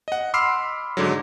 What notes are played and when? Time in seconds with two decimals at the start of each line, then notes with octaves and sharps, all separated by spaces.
0.08 D#5 F#5
0.34 B5 C6 D6 E6 F6 C7
0.97 G#2 D3 F#3